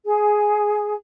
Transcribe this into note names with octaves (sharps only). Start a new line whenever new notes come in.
G#4